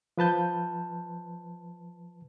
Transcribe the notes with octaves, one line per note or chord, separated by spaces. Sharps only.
F3 B4 A5 G6